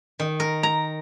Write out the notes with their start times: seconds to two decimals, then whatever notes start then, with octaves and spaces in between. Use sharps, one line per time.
0.20 D#3
0.40 A#4
0.63 A#5